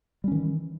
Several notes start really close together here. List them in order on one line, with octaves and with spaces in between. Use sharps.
G3 C#4 D#3 E3